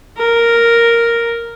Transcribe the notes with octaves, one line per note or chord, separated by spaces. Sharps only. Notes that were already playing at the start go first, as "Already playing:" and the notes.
A#4